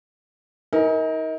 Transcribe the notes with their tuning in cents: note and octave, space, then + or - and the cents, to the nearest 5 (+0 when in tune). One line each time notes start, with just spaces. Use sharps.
D#4 +35 A#4 +0 G#5 +0